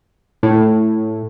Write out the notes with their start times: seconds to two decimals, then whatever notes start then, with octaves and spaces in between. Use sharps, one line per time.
0.43 A2